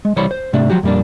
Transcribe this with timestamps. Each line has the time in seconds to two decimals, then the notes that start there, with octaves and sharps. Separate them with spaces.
0.05 G#3
0.16 C2 E3 G3 C5 C#5 B5
0.31 C5
0.53 G#2 C3 A3 D4
0.70 F3 F#3 F#4 G4
0.83 F2 A#2 G3 A#3 D4